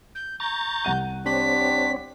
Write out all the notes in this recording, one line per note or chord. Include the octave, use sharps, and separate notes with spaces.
G6
A#5 C#6 G6 A6
C2 F#5 D#7
C4 D4 G4 C#5 B6